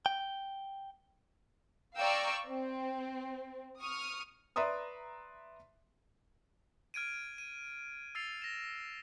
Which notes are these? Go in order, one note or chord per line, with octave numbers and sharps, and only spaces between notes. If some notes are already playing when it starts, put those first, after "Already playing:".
G5
D5 F5 G5 A#5 C#6 E6
C4
C#6 D#6 F6
B4 D5 E5 A#5 C6 D#6
F6 G#6 D7 D#7
D#7
E6 A6 C7 F7
A#6 E7